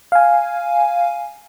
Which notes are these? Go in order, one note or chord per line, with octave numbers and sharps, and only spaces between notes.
F5 G#5